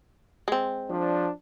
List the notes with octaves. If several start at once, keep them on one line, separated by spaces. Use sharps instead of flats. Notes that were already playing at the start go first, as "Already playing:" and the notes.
G#3 C4
F3 D4